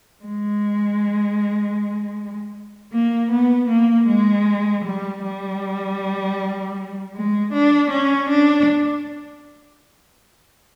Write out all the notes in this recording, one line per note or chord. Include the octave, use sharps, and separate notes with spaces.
G#3
A#3
B3
A#3
G#3
G3
G3
G#3
D4
C#4
D4